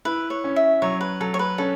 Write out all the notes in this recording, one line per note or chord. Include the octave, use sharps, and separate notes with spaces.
E4 B4
C#5
C#4
E5
F#3 C#5
B4
F#3 A4
C#5
B4
C#4 A4